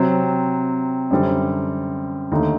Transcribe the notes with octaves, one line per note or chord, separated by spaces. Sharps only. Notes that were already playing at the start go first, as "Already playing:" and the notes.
Already playing: C3 F#3 C4
F#2 D3 G3 C4
D#2 D3 A3 D#4